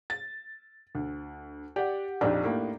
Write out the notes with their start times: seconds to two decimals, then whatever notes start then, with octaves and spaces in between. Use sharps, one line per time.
0.10 A6
0.95 D2
1.76 G4 D5 F#5
2.21 A#1 F2 D4 D#4 G4
2.44 A2 A#3